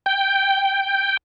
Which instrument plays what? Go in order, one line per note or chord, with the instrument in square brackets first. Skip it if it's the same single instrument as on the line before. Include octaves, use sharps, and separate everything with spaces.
[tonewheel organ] G5